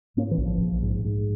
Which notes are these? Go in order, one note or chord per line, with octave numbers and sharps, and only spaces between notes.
G#2 A#3 C#4
E3
A#1
F3
A#1
G#2
G#2